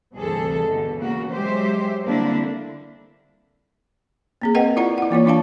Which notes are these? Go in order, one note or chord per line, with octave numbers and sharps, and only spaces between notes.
D2 G2 C3 E3 G#4 A4
B2 D3 E3 G#3
C#3 E3 A#3 F#4
F#3 G#3 G4 C5 E5
D3 G3 A#3 C4 D4 E4
A#3 C4 G#4
A#4 B4 D#5 F#5 G5
E4 F4 D5 F#5 A#5
E4 F#5
E3 A#3 F4 C#5
E3 D4 F4 F5 A5